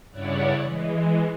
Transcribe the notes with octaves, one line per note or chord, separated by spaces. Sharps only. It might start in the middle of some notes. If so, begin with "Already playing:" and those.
G2 C#3 E4 C#5 D5 F#5
E3 G#3